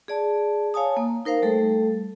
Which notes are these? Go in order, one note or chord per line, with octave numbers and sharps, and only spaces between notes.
G#4 D5 A5
C#5 F5 G#5 A5 D#6
A#3
D#4 A#4 C5 F5
G3 A3 A4